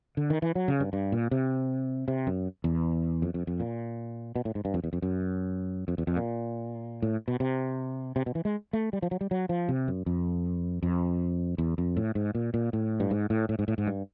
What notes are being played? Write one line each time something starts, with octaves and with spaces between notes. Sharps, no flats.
D3
D#3
E3
F#3
C#3
G2
G2
A#2
C3
C3
F#2
E2
F2
F2
F2
A#2
B2
A2
G#2
G2
F2
E2
F2
F#2
F2
E2
F2
A#2
A2
B2
C3
C3
B2
E3
G#3
A3
G3
F3
F#3
G3
F#3
F3
C3
F#2
F2
F2
E2
F2
A2
G#2
A#2
A#2
A2
G2
G#2
A2
A2
G#2
A2
G#2
G2